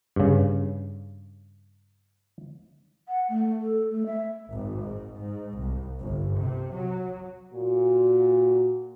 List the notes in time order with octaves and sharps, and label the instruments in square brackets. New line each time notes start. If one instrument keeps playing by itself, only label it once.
[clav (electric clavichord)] G2 C#3
[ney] F#5
A3
A4
A3
E5
[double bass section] G#1
G#2
G#2
C2
G1
C3
F#3
[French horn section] A#2 F#4